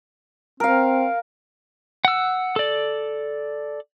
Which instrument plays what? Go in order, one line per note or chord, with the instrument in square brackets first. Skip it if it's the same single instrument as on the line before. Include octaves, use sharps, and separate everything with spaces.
[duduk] C4 [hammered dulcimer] A#4 F5
[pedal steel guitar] F#5 E6
A4 D5